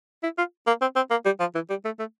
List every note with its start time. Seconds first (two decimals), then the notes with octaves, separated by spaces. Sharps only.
0.23 E4
0.38 F4
0.67 A#3
0.81 C4
0.96 C4
1.10 A#3
1.25 G3
1.40 F3
1.55 E3
1.70 G3
1.85 A3
1.99 A3